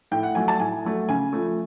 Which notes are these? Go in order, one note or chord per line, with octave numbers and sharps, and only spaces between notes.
A2 G5
F#5
F#3 A3 G#5
A5
A2 G#5
F#3 A3
C#3 G#5
F3 A3